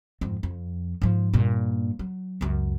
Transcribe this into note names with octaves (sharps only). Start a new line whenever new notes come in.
F2 G#2
F2
G#2 F3
G2 A#2
F#3
C#2 F#2